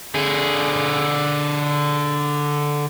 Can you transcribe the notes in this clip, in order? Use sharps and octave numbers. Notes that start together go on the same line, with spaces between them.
D3 G#4